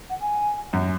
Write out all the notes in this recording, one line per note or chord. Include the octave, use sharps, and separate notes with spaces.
F#5
G#5
F#2